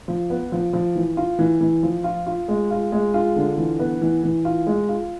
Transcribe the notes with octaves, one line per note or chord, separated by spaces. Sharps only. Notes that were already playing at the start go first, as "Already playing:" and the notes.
F3
B3
F3
F3
E3
F4
E3
E3
F3
F4
F4
G#3
F4
G#3
F4
D3
E3
B3
E3
E3
F4
G#3
F4